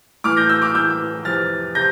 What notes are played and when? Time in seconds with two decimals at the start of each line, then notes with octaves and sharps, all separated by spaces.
0.24 A2 E3 D6 F6
0.37 G6 A#6
0.49 E6 G6
0.62 D6 F6
0.74 A2 E3 E6 G6
1.25 F2 C3 E3 F6 A6
1.75 C3 G6 A#6